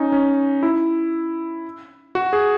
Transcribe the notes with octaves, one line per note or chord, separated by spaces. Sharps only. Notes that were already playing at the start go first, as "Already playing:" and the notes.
Already playing: C#4 D#4
C#4
E4
F#4
G#4